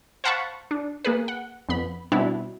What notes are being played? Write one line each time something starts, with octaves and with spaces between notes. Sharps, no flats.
C5 F5 F#5 A5 B5 C#6
D4
A#3 G#4 B4
F#5
F2 B3 B5
B2 G3 C4 D4 E4